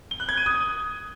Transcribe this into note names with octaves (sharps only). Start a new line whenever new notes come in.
G7
F#6
G#6
D#7
D#6